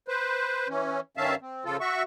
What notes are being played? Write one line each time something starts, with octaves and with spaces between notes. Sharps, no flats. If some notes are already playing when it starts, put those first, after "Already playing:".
B4 C5
E3 C#4
G2 D#3 C#4 E5 F5 A5
C4
C#3 F3 F4 A4
F#4 E5 C#6